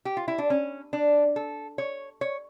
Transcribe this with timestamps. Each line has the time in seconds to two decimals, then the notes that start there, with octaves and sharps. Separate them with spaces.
0.05 G4
0.17 F4
0.28 E4
0.38 D4
0.50 C#4
0.93 D4
1.36 A4
1.78 C#5
2.21 C#5